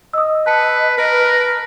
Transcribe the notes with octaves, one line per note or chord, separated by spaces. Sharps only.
D#5 D#6 E6
B4 A5 C#7
A#4 B4